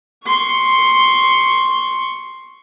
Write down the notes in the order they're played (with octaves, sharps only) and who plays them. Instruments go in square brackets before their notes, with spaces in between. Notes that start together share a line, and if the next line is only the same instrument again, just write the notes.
[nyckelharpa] C6 C#6